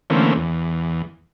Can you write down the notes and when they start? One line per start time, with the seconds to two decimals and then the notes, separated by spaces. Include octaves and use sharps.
0.10 D3 E3 A3 A#3 C4 C#4
0.36 E2